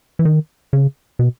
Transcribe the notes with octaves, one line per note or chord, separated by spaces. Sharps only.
E3
D#3
C#3
B2